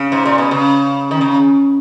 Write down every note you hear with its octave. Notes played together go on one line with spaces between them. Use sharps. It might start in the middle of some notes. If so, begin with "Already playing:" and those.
Already playing: C#3
G#2
A#2
B2
C#3
D#3
C#3